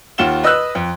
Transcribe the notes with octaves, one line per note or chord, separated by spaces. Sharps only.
D#2 F4 F#5 E7 G7
B4 D#5 D#6 E6 F#6
F2